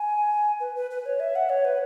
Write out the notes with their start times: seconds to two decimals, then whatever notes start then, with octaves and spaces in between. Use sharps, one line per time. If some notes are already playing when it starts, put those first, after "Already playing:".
Already playing: G#5
0.60 B4
0.76 B4
0.91 B4
1.06 C#5
1.20 E5
1.36 F#5
1.49 C#5
1.65 B4